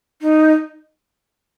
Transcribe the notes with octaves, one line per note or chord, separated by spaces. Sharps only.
D#4